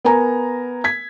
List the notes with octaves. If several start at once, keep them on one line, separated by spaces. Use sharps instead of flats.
B3 A#4 G#5 A#5
G#6 B6